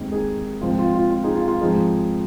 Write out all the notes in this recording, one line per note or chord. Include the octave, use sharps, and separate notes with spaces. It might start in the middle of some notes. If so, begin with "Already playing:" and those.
Already playing: D#2 D#3 G#3 C4
D#4 G#4
G#2 F3 C4 F4
F4
F4
F4
D#4 G#4
F4
F4
G#2 F3 C4 D#4 G#4